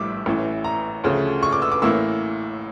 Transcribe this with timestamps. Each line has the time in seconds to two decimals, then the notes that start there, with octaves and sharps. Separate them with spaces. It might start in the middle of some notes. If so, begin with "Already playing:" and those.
Already playing: A#1 A2 G3 D6 E6
0.26 A1 A2 E3
0.64 A#5
1.04 D2 C#3 F3 A3
1.43 C#6
1.52 D6
1.62 E6
1.72 D6
1.82 A1 A2 E3 A#3 E6